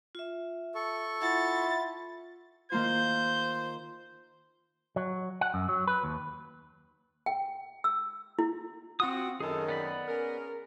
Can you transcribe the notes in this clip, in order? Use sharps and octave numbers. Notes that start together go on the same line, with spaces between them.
F4 E5
A4 C#6
E4 F4 E5 F#5 B5 A6
D#3 A#3 F4 C5 G6
F#3
F#5
F#2
F#3
B4
D#2
G5
E6
E4
C4 F4 F#4 D#6
F#2 D#3 G#4 A4
B3 D5 B5
C#4 G#4 A#4